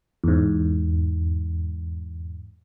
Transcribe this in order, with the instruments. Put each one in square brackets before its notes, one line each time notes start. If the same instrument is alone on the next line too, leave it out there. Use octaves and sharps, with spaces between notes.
[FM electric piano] E2 G#2